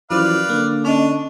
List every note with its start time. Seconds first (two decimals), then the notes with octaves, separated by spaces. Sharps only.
0.11 F#2 E3 F3 B4 C5 D5 F5
0.49 D3 A#3
0.85 C#4 D4 D#5